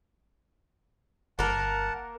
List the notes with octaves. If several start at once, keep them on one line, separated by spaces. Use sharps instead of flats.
G1 A#3 A#4 F#5 A5